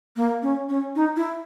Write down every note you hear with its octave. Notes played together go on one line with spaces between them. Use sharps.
A#3
C#4
C#4
D#4
E4